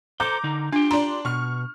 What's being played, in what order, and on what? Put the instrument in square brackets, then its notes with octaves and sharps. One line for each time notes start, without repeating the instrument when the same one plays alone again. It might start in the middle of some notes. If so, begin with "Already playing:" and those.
[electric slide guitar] A4 C5 [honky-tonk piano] A#5 D6 G6
[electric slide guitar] D3 D#4
[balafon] D4 [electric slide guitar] F4 G4
[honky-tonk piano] D4 C6 [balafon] A#5
[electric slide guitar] B2 [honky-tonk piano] C#6 F6